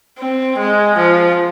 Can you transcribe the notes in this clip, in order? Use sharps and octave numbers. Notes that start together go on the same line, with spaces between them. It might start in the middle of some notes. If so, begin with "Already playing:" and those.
C4
G#3
F3